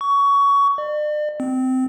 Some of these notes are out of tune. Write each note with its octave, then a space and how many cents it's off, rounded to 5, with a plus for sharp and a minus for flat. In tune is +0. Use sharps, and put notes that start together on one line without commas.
C#6 +20
D5 +40
C4 -20